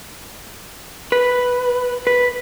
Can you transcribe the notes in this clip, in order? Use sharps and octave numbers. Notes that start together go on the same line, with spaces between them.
B4
B4